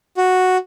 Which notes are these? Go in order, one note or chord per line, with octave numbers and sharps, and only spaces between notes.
F#4